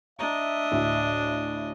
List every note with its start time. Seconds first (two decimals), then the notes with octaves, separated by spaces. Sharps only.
0.19 D4 D#5 E5 A#5
0.71 D2 A2